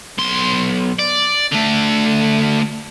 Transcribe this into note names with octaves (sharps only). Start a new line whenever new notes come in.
B1 C6
D5
D3 A3